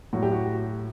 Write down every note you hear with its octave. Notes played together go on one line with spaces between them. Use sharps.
A2 F#3 F#4
G4
F#4